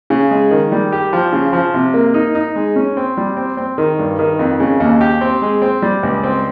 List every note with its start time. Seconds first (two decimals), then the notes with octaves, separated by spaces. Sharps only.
0.10 C#3
0.31 G#3
0.51 D#3
0.72 G3
0.92 G4
1.13 F3
1.33 C#3
1.53 F3
1.74 C3
1.94 A#3
2.14 D#4
2.35 D#4
2.56 G#3
2.76 C#4
2.97 C4
3.17 G3
3.37 C4
3.57 C4
3.78 D#3
3.99 G2
4.19 D#3
4.39 F2
4.60 C#3
4.80 D#2
5.01 G4
5.21 C4
5.42 G#3
5.62 C4
5.82 G3
6.03 C#2
6.24 C4